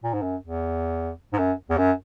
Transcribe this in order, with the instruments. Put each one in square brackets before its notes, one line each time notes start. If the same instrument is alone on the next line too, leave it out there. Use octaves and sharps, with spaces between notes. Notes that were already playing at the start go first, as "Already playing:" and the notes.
[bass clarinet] A#2
G#2
F#2
E2
G#2
F#2
E2
F#2